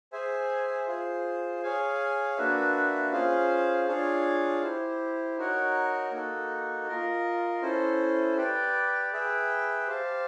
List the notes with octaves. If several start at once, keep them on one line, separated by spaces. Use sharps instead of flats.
G#4 C5 E5 G#5
F4 G#4 C5
G#4 C#5 F5 G#5
A#3 D4 F#4 B4 E5
C#4 F4 G#4 C5 F5
D4 F4 G#4 C#5 F5
E4 G4 C5
D#4 F#4 A#4 C#5 F#5
A#3 D#4 F#4 A4
F4 A#4 D#5
C#4 E4 A4 C5
G4 B4 D5 G5
G#4 B4 E5 G5
G4 C5 F5 A5